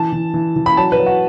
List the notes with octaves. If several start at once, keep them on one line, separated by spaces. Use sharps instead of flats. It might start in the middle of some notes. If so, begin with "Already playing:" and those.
Already playing: E3 A5
E3
E3
E3
B5
F#3 A5
B4
F#3
F#4